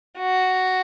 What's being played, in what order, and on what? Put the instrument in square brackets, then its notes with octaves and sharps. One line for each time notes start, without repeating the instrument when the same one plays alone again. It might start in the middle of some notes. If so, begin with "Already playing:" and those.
[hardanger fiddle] F#4